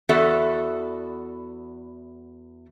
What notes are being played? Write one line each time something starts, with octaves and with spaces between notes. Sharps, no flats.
E2 B3 F#4 A4 D5 E5